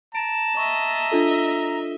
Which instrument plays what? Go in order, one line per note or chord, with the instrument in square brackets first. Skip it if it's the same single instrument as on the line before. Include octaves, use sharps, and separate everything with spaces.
[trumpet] A5 [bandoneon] A#5 [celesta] D7
[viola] D#5 E5 [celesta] C#6
[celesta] D4 F4 A4